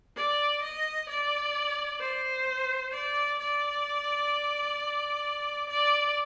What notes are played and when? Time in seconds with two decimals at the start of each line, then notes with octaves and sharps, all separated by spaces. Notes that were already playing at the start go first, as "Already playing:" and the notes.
0.16 D5
0.62 D#5
1.09 D5
2.00 C5
2.92 D5
3.39 D5
5.69 D5